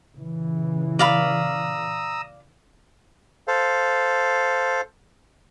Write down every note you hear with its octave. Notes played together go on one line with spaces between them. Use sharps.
A#2 C#3 E3
D5 F5 A#5 B5 D#6 E6
A4 C5 F5